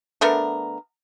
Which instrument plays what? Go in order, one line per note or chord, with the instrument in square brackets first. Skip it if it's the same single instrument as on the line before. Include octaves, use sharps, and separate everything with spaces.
[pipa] D3 A3 B3 A#4